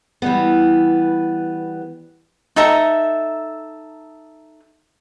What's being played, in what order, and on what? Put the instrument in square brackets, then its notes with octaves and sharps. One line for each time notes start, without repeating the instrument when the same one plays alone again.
[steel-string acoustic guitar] E3 G3 B3
[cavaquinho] D#4 A4 E5 A#5